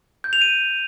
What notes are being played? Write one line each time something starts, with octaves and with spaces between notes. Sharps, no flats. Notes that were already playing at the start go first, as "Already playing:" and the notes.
G6
F7
D#7